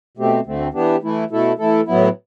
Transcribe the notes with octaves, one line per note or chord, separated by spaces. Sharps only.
B2 A3 C4 G4
D2 D3 A3 C4
E3 B3 D4 G4
E3 A3 E4
B2 A3 E4 A4
E3 A3 E4 A4
A2 F#3 B3 E4